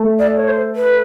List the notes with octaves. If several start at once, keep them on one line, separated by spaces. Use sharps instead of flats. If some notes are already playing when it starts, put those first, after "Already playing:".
Already playing: A3 A4
D5
C#5
C5
B4